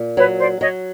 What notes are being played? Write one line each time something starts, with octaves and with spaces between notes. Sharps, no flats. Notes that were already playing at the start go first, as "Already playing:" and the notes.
Already playing: A#2
F#3 B4 C#5
C5 D5
F#3 C#5 D#5